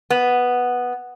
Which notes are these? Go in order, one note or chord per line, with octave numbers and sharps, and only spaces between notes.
B3